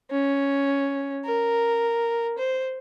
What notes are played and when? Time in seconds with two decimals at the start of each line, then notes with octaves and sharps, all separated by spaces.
0.11 C#4
1.25 A#4
2.38 C5